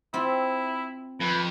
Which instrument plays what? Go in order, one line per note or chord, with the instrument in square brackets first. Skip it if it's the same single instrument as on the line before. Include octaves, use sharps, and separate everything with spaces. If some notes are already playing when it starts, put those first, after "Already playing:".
[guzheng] C4 F4 [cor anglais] E4
[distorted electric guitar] F2 [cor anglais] B4